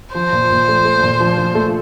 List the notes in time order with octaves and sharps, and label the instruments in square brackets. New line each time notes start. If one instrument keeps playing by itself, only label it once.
[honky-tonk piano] F3 [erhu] C5
[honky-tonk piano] A#2
A#2
A3
A3
A#2
F3
F3
A3